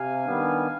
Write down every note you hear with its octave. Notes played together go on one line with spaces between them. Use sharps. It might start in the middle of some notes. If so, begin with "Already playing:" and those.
Already playing: C3 F5 G#5
D#3 G3 B3 D4